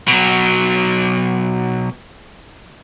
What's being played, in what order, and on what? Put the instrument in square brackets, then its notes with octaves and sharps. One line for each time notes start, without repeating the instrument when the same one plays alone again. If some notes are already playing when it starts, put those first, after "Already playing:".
[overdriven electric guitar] B2 F#3